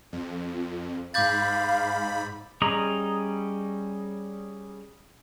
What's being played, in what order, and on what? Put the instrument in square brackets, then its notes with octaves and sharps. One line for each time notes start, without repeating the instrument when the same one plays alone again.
[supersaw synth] F2
[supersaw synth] G#2 B5 [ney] F5 [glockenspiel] D6 G6 A6
[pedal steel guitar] G3 C#4 G#4 D#5 A#5